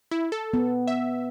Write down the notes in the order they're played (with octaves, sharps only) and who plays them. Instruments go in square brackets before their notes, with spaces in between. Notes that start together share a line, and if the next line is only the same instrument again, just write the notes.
[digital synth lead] E4
A4
[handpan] B3
[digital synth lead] E5